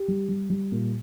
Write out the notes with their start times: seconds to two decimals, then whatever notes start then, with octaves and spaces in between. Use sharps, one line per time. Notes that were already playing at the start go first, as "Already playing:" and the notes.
Already playing: G4
0.08 G3
0.28 G3
0.50 G3
0.72 A#2